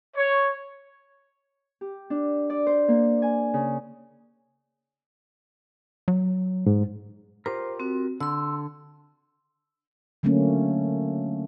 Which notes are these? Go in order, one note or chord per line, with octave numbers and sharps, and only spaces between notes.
C#5
G4
D4
D5
C5
A#3
G#5
C#3
F#3
G#2
F4 G4 A#4 C5
C4 F#4
D3 C6 E6
D3 F#3 A3 A#3 C#4